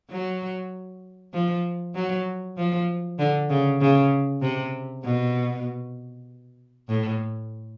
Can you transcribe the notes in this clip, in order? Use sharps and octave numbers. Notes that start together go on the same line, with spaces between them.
F#3
F3
F#3
F3
D3
C#3
C#3
C3
B2
A2